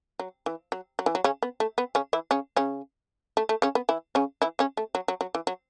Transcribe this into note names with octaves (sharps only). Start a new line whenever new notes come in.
F#3
E3
F#3
F#3
E3
F#3
C#3 C#4
B3
A3
B3
C#3 C#4
E3 E4
C#3 C#4
C#3 C#4
A3
A3
C#3 C#4
B3
E3 E4
C#3 C#4
E3 E4
C#3 C#4
A3
F#3
F#3
F#3
E3
F#3